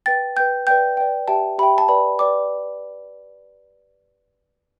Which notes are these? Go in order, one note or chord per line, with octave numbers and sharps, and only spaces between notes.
B4 G5 A6
B4 G5 G6
B4 D5 G5 G6
B4 D5 G5
G4 E5 G5 A5
G4 E5 G5 B5
A5
B4 D5 G5 B5
B4 D5 G5 D6